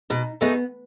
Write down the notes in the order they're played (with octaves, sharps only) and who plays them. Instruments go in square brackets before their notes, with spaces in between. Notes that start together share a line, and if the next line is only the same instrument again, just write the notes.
[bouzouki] B2 [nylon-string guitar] D#4
[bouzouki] A3 D#4 G#4 [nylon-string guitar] B3